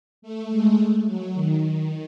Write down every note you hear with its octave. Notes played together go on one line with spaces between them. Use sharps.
A3
G#3
F#3
D#3